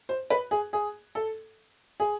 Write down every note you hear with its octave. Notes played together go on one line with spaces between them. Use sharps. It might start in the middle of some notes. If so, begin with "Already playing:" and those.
C5
B4
G#4
G#4
A4
G#4